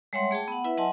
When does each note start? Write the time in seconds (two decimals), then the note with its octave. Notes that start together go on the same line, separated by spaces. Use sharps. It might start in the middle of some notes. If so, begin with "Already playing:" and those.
0.13 G3 G#3 C#5 E5 F#5 C6
0.31 A3 G#4 G5 A5
0.48 B3 F#5
0.64 E4 B4 E5
0.77 F#3 D#5 F#5 G#5 A5 C6